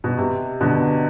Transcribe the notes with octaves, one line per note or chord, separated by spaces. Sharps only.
B2
C3
B2 D3